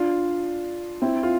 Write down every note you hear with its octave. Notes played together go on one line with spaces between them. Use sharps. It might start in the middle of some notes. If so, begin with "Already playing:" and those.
Already playing: D4 F4
C4 E4
F4